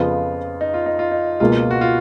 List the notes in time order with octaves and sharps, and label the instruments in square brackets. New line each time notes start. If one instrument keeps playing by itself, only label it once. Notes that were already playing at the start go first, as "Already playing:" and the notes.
Already playing: [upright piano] F2 C#3 F3 B3 [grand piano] F4
[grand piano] D#4
F4
D#4
F4
D#4
[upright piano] C#2 B2 A#3 [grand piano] F4
[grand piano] F#4
F4